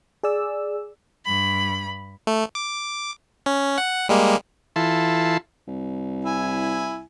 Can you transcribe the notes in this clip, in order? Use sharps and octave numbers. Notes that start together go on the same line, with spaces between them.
G#4 D5 E6
G2 B5
A3
D6
C#4
F#5
G3 G#3 A#3
E3 E4 F4 A4 A5 C6
C2
E4 G#5